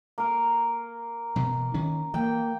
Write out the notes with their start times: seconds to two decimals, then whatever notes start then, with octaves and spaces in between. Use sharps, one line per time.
0.18 A#3 A#4
1.36 B2 E3
1.74 D#3 C#4
2.14 E3 A#3 G5